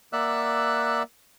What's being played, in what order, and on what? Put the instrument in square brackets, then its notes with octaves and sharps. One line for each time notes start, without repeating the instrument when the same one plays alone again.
[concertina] A#3 D5 E5 F#5 E6 F#6